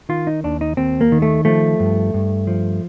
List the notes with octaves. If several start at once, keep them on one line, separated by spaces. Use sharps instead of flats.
D#3 F4
D#4
D#2 D4
D#4
D#2 C4
A#3
D#3
A3
F3 A3
G2
G2
F3